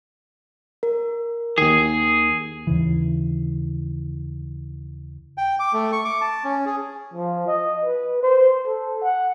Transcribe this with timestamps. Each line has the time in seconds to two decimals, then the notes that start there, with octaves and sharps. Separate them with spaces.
0.83 A#4
1.58 D#2 D#3 G#4
2.67 D#2 C#3 E3
5.38 G5
5.60 D6
5.73 A3
5.92 C#6
6.05 D6
6.21 A5
6.44 C#4
6.66 G#4
7.13 F3
7.47 D#5
7.85 B4
8.23 C5
8.66 A4
9.02 F#5